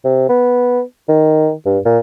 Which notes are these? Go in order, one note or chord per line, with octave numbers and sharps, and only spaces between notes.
C3
B3
D#3
G2
A#2